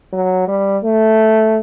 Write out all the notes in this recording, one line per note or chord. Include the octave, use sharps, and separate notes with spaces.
F#3
G3
A3